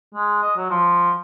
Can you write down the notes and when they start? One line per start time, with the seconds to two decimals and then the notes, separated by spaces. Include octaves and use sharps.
0.14 G#3
0.42 D#5
0.56 F#3
0.70 F3